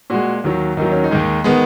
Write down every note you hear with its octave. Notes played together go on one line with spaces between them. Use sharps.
A#2 G#3 F#4
D#2 D#3 F#3
D#2 D#3 F#3 D#4
C#4
D#4
D#2 D#3 G#3
D#3 G#3 B3